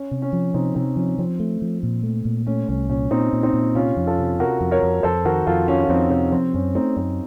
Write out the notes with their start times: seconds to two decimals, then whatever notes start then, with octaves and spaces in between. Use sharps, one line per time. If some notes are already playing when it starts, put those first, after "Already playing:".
Already playing: C#4
0.11 C3
0.22 C#4
0.33 F3
0.54 C3 C4 D#4
0.75 C3 C4 D#4
0.96 F3 C#4
1.18 F3 C4
1.40 A3
1.62 F3
1.83 A#2
2.03 A3
2.25 A#2
2.47 A3 C#4
2.68 C2 C#4
2.89 A#2 C#4
3.11 A#2 C4 D#4
3.33 A#2
3.43 C4 D#4
3.53 A#2
3.75 C3 C#4 F4
3.97 F2
4.07 F4 A4
4.19 C3
4.39 C3 F#4 A#4
4.61 F2
4.71 A#4 C#5
4.83 F2
5.03 F2 A4 C5
5.25 D#3 F#4 A#4
5.46 F2 F4 A4
5.68 D#3 C#4 F4
5.84 F4
5.89 F2 C4 D#4
6.10 C3 C4
6.32 F3 C4
6.54 F#2 C#4
6.75 A3 C4 D#4
6.96 F#2 C4